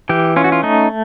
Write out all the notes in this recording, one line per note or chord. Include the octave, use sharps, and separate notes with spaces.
E3 G4
C#4 F4
F#4
F4
A3 D#4